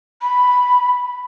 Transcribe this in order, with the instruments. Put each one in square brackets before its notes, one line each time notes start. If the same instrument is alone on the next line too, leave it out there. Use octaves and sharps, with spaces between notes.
[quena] B5